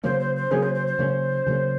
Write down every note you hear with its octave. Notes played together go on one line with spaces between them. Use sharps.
C#3 F#3 A#3 C#4 C5
C5
C5
C#3 F#3 A#3 C#4 G#4
C5
C5
C5
C#3 F#3 A#3 C#4
C#3 F#3 A#3 C#4